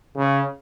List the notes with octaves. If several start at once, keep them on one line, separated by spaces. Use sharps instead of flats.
C#3